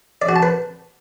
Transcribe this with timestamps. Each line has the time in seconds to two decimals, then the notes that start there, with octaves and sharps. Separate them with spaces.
0.22 D5
0.29 F#4
0.36 A5
0.43 B4